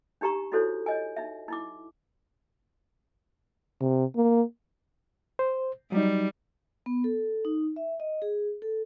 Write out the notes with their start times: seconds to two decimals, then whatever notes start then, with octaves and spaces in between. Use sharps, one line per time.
0.21 D4 D#4 G4 A#5 C#6
0.52 D#4 E4 F#4 A4 C5 C#5
0.86 C#5 D#5 G#5
1.16 D#4 E5
1.48 D#4 E4 D6
3.81 C3
4.16 A#3
5.39 C5
5.92 F#3 G3 D#4
6.86 B3
7.04 A4
7.45 D#4
7.76 E5
8.00 D#5
8.22 G#4
8.62 A4